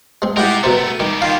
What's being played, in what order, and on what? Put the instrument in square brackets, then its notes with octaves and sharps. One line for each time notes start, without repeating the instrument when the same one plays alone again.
[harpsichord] G#3 C4
[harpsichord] G#3 E4 [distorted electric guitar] F4 A#4 [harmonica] G4 F#5
[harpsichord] B2 C4 [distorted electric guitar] A3 B3 [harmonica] A#4
[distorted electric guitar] B2 G4 [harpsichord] D#3
[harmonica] D#3 A#3 F4 [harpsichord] F5